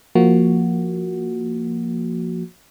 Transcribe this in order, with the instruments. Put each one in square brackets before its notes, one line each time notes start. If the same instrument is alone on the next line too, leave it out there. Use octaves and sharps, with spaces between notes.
[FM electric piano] F3 A#3 F#4